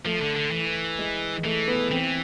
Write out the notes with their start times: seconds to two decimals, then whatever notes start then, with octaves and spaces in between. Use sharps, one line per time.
0.05 F3 A3
0.21 D3
0.36 D3
0.51 E3
0.99 G#3
1.44 E3 A3
1.68 B3
1.91 E3 C4